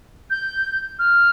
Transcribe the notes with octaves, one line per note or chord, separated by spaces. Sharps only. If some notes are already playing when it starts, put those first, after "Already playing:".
G6
F6